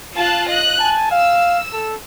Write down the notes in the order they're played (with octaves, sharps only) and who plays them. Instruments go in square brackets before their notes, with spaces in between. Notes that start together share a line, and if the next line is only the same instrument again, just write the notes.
[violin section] F4 A5 F#6
D#5 F#6
[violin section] G#5 [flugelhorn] A5
[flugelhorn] F5 [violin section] E6
[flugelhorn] A4